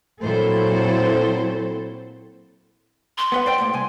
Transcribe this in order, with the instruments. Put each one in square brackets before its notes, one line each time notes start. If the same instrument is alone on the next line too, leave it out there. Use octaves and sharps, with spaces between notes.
[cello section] A#2 F#3 C4 E4 A4 C5
[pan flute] C6
[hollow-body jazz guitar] B3 B4 F#5
C5 D5 G5
A2 G#3 A#3
C2 G#5